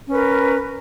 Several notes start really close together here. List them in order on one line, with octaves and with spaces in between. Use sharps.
C#4 B4 A#4